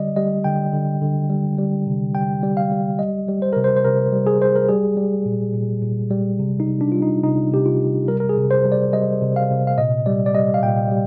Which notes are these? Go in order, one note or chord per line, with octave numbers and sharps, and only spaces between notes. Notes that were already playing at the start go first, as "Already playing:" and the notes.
Already playing: D3 G3 D5 D#5
G3 D#5
D3 G5
D3
D3
G3
G3
C3
G3 G5
G3
F5
G3
G3 D#5
G3
C5
C3 A#4
C5
C5
C3 A#4
G3
G#4
G3 C5
A#4
G3 G#4
G3
A#2
A#2
A#2
G3
C3
D#4
C3
D4
G3 F4
D#4
C3 D#4
C3 G4
F4
C3
G3 A#4
A#4
G#4
C3
C5
G3
D5
G3 D#5
C3
F5
C3
F5
A#2 D#5
G3 D5
D5
G3 D#5
F5
A#2 G5
G3